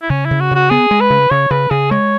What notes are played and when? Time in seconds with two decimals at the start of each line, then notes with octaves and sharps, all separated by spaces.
0.02 E4
0.10 C#3 C#4
0.26 E4
0.31 C#3
0.40 F#4
0.51 C#3 F#4
0.70 B3 G#4
0.91 G#3
1.01 B4
1.10 C#3
1.30 C#3 C#5
1.51 C#3 B4
1.71 C#3 G#4
1.91 G#3 C#5